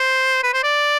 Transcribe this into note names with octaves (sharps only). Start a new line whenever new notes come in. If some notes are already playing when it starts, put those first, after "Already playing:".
Already playing: C5
B4
C5
D5